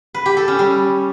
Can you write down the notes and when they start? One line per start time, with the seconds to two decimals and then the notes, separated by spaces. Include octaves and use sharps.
0.14 B4
0.26 G4
0.37 A4
0.48 C#4
0.59 G3